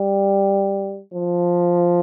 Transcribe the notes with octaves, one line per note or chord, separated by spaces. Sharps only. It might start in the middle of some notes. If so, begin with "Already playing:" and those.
Already playing: G3
F3